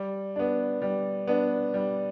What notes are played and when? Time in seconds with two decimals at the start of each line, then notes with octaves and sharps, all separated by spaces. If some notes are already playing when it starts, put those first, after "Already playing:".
Already playing: G3
0.36 B3 D4
0.82 G3
1.27 B3 D4
1.74 G3